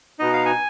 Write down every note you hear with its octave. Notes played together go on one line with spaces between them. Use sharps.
B2 B3 D#4 D#5
F5
G#5